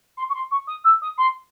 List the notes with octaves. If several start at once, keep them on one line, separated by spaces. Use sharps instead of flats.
C6
C#6
C6
C#6
D#6
E6
D#6
C6